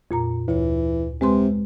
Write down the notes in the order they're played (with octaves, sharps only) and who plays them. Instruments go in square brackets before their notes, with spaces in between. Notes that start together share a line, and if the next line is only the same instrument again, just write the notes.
[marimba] F2 A#2 A#5
[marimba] D2 C#5 [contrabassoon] E3
[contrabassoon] C3 [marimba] G#3 B4 C6